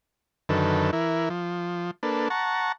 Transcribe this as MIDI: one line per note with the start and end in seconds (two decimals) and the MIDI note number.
0.49 0.91 42
0.49 0.91 50
0.49 0.91 51
0.49 0.91 69
0.49 0.91 71
0.93 1.29 52
0.93 1.29 64
0.93 1.29 70
1.30 1.91 53
2.03 2.28 58
2.03 2.28 62
2.03 2.28 69
2.03 2.28 71
2.30 2.72 78
2.30 2.72 81
2.30 2.72 82
2.30 2.72 85